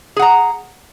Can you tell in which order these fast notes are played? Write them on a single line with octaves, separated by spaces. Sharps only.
G#4 F#5 A#5